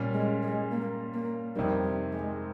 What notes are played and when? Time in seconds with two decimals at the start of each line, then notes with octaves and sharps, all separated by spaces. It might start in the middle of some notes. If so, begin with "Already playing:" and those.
Already playing: A#2 G3 C#4
0.14 G#3
0.43 G#3
0.72 A#3
1.14 A#3
1.56 F2 C3 D#3 G3 A#3
1.84 G3
2.13 G#3